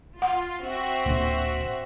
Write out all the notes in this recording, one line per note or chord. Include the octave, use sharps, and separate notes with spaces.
F4 F#5
C4 F#4 E5
D1 A#2 D3